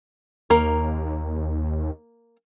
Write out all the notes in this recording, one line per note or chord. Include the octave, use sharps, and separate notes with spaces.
D#2 A#3 A#4